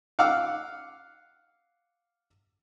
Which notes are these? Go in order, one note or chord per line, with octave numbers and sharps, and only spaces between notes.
F5 F#5 D6 E6 F6